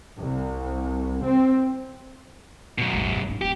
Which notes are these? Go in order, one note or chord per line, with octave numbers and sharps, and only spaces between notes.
C2
C4
F#2 B2
G#1 D#2
G#2 D4
D1 C4 G4